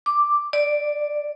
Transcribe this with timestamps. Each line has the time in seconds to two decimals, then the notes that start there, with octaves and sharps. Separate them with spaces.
0.06 D6
0.53 D5